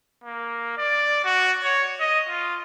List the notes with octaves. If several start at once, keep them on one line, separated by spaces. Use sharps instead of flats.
A#3
D5
F#4
C#5
D#5
F4